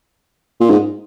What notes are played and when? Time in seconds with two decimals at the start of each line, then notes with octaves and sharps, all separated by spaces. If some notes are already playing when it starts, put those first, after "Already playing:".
0.61 A#2
0.70 G#2